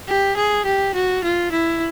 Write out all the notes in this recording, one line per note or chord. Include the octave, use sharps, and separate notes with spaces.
G4
G#4
G4
F#4
F4
E4